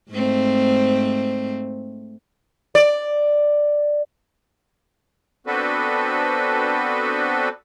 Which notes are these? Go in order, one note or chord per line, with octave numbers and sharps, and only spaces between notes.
G#2 A3 C4
D5
B3 C4 D4 F#4 A4 B4